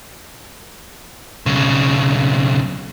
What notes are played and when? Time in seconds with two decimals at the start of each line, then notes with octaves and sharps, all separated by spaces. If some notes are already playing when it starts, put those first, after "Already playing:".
1.46 B1 C#3